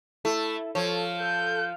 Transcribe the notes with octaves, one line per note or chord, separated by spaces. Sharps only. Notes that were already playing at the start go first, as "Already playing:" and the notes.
A3 E4 A4
F3 A4 C#5
A4 G6